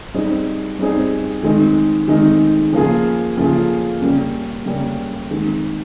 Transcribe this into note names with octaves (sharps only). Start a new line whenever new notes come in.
G3 C4 D#4 G#4 C5
G3 C4 D#4 G#4 C5
D#3 G#3 C4 D#4
D#3 G#3 C4 D#4
C#3 F3 A#3 F4 G#4
C#3 F3 A#3 F4 G#4
C#3 G3 A#3 C#4 G4
C#3 G3 A#3 C#4 G4
D#3 G#3 C4